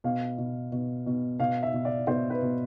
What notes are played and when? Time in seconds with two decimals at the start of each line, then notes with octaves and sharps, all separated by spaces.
0.04 B2 F5
0.38 B2
0.72 B2
1.06 B2
1.39 B2 F5
1.63 E5
1.73 B2
1.85 D5
2.07 B2 C5
2.30 B4
2.42 B2